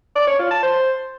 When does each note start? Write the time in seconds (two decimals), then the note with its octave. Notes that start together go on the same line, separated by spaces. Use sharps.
0.16 D5
0.27 C#5
0.39 F4
0.51 A5
0.63 C5